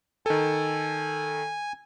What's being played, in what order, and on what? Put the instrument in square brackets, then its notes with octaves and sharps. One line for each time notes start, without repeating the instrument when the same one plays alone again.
[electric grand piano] D#3 A4 [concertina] G#5